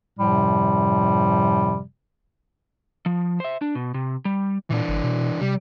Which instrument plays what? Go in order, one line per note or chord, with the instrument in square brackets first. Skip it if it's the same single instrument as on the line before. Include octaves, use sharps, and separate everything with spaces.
[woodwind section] F#2 A2 C3 F3 G3
[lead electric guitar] F3
C5 E5
D4
B2
C3
G3
[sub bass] A#2 [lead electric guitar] E3 D4
[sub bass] G1
B2
[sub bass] C3 [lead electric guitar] G3